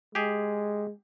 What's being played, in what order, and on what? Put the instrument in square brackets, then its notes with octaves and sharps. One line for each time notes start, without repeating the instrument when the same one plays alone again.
[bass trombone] G#3 [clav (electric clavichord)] G4 G#4